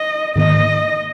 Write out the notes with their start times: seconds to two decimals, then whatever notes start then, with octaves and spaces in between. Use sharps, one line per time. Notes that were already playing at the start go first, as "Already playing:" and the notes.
Already playing: D#5
0.36 G#2 D#3 A#3 D#5